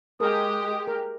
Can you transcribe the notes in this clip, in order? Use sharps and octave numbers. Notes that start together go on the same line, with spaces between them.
G#3 G4 G#4 A#4 D#6
A#4